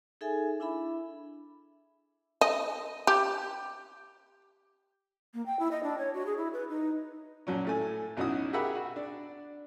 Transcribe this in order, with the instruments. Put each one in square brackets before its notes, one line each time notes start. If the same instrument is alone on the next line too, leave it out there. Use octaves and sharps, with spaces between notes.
[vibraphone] D#4 G#4 A4 E5 G#5
D4 E4 E5 B5
[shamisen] D#5
G4
[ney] A#3
G5
E4
D#5
D4
C#5
F#4
G#4
E4
B4
D#4
[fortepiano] A#1 F#3 C#4
A2 A3 G#5
B1 C#4 D#4 E4 F#4 D#6
G4 G#4 A#4 E5 F#5 B5
F#4
D4